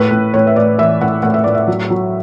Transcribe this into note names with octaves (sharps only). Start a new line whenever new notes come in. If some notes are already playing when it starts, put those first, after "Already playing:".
Already playing: A2 B4
A2
A2 C#5
E5
A2 D5
E3 E5
A2 F#5
A2 F#5
E5
A2 D5
E5
F#3
F#3